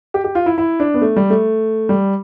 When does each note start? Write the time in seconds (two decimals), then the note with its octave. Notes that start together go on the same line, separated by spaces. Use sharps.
0.14 G4
0.24 G4
0.35 F4
0.46 E4
0.58 E4
0.80 D4
0.94 B3
1.02 A3
1.16 G3
1.30 A3
1.89 G3